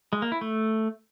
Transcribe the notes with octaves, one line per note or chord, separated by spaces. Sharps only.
G#3
A#3
E4
A3